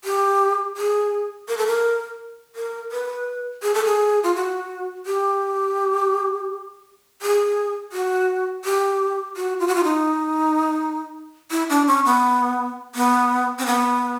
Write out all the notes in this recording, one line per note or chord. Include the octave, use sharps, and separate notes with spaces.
G4
G#4
A#4
A4
A#4
A#4
B4
G#4
A4
G#4
F4
F#4
G4
G#4
F#4
G4
F#4
F4
F#4
F4
D#4
E4
D4
C#4
B3
B3
C4
B3